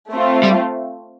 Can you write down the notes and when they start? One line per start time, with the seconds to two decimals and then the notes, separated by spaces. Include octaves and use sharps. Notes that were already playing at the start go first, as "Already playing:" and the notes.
0.11 A3 C4 F4
0.43 G3